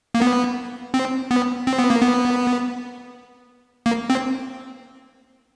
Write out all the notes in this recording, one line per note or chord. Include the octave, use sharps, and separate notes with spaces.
A#3
B3
C4
B3
C4
B3
A#3
B3
A#3
C4